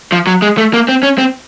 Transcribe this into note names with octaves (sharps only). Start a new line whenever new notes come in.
F3
F#3
G#3
A3
A#3
C4
C#4
C4